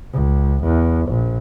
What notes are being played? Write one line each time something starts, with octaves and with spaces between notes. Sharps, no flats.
C#2
E2
A#1